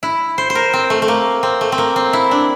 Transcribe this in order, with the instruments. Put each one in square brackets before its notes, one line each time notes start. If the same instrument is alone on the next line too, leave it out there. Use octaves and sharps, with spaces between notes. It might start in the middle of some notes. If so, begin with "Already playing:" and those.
[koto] E4
C5
C5
A#4
C4
A3
A3
A#3
C4
A3
C4
A#3
C4
E4
D4